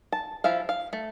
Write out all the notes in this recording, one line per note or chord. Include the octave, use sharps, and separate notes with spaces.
A5
F3 E4 E5 F5
F5
A3